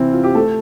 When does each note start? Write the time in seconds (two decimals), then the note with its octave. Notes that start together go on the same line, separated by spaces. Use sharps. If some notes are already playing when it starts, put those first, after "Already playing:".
Already playing: C3 E3 C4 E4
0.13 F4
0.24 G4
0.35 A3 A4